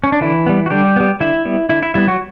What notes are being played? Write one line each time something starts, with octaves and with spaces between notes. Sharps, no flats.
C#4
D4
D3 E3 E4
G3 B3
F#4
D3 G3 G4
G3 B3
D3 E4 E5
G3 B3
D3 E4 E5
E4 E5
G3 B3 E4 E5
F#3 F#4